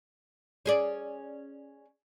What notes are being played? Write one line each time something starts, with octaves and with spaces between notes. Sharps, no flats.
C#4 G#4 D5